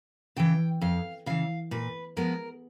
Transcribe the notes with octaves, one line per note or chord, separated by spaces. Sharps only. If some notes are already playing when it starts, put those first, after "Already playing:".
C#3 E3 G5
F2 F5
C#3 E3 F5
A#2 B4
F3 G#3 B3 A#4